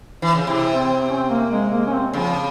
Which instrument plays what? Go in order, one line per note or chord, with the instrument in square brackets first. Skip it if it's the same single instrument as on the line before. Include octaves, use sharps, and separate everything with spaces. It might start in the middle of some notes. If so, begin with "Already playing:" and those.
[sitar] E3
C#3
[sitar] C3 [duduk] E4
[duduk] C4
C4
C#4
C4
A#3
G#3
A#3
C#4
C4
[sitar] C#3 [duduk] F3